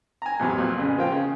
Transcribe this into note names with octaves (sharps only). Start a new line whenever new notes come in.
G#5 A#5
E2 A2 C3 F#3
F2 A#2
A1 C#3
F3 A#3 F4 G5
C#3